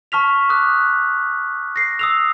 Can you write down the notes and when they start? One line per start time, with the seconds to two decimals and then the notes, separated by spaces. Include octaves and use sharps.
0.12 A5 C#6 F6 B6 F7
0.49 D6 D#6 F#6
1.76 A#6 C7
1.99 D#6 E6 F7